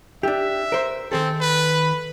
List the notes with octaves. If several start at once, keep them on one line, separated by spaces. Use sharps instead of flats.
D4 G4 E5
A#4 C5
D#3 C4 G#4 A4
B4